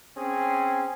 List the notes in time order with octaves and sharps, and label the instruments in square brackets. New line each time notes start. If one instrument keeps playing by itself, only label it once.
[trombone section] C4 C#4 G#4